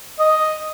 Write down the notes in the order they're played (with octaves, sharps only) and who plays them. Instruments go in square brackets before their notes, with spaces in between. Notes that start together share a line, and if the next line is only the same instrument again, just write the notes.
[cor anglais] D#5